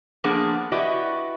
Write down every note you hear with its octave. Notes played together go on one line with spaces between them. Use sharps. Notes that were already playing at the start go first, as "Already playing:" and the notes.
F3 A#3 B3 D4 G#4
E4 F#4 G4 B4 D5 D#5